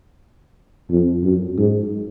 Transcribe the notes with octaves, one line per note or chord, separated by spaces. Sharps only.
F2
F#2
G#2